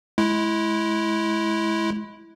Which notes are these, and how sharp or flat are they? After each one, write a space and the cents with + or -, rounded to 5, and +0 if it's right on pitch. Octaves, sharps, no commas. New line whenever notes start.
G#3 +35 E4 +0